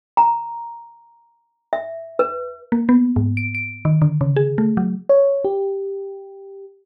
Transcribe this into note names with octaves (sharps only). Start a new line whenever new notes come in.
A#5
E5
B4
A#3
B3
G#2
D7
D7
D#3
D3
C#3
G#4
A3
F#3
C#5
G4